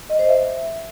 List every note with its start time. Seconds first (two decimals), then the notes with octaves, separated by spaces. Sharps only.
0.10 D#5
0.19 C5
0.29 E5